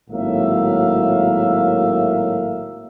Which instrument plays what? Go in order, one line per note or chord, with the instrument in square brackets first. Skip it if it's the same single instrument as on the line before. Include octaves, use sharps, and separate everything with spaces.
[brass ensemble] G#1 A2 F#3 A#3 E5 F5